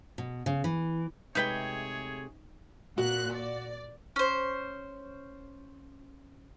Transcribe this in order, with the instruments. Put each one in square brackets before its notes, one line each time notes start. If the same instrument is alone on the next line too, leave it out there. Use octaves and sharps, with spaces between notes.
[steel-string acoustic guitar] B2
C#3
E3
[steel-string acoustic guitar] C3 G#3 A3 [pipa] D#4 B4 G5 [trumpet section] G#4 C#5
[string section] A#2 F#6 [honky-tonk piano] F#4
[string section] D5
[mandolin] C#4 C5